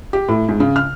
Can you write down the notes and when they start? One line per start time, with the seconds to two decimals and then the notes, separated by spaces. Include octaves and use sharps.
0.13 G4
0.29 A2
0.49 G#2
0.60 C#3
0.76 F6